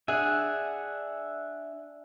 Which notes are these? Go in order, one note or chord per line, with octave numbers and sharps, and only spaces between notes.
D4 G#4 E5 F#5